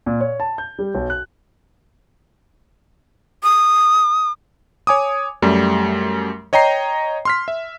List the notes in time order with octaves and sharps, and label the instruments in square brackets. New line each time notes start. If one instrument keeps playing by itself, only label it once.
[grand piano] A#2
C#5
A5
G6
G3
B1
F#6
[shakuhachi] D#6
[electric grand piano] C#5 G#5 D6 D#6
F#2 G3 A3
C#5 D#5 G5 A#5 C7
C6 F6 B6
E5